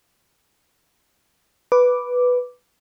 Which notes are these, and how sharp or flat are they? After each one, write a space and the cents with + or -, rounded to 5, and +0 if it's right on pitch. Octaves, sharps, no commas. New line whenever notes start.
B4 +0 D6 +0